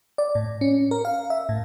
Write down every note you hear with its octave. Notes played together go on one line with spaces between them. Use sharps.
D5
A2
C#4
A#4
F5
E5
A2